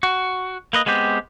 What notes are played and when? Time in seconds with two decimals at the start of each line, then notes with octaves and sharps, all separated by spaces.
0.03 F#4
0.73 A#3 B4 D#5
0.86 G#3 B3 C4 G4